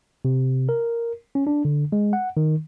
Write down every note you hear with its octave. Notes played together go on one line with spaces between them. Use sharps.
C3
A#4
C#4
D4
D3
G#3
F#5
D#3